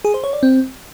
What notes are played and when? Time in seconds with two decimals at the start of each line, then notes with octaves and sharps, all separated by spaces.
0.05 G#4
0.14 C5
0.24 C#5
0.33 D5
0.43 C4